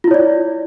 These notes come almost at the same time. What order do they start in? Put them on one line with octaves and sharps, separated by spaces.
F4 E4 C#5 D5